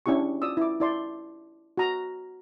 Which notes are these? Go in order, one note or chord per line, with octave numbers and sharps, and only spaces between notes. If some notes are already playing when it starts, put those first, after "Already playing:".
C#4 D4 E4 G4 C#6
F4 D5 D#6 E6
E4 D6
E4 D5 C6
F#4 A#5